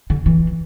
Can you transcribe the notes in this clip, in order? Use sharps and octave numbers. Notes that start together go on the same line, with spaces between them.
D3
E3